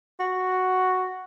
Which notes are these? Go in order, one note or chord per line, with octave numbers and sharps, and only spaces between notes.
F#4